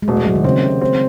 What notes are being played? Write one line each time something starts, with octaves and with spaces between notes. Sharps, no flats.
G#3
E1 A3
G#3
E1 F#3
D#3
C#3 C4
C3
C4